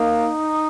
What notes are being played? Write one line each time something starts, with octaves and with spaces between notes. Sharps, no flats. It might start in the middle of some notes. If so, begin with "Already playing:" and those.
Already playing: A#3 D#4